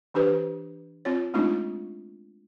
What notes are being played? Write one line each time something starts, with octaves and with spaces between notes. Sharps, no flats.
E3 D4 G4 B4 C5
C4 F4 C#5
G#3 A3 C4 D4 D#4 F4